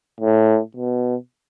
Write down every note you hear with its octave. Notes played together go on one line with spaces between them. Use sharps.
A2
B2